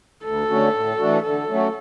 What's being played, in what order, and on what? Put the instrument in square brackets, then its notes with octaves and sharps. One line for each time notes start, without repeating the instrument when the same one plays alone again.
[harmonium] D2 [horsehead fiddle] A4
[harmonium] D3 A3 C#4 F#4
A2
E3 A3 D4 F#4
[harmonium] D3 [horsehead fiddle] A4
[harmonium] F#3 A3 C#4 F#4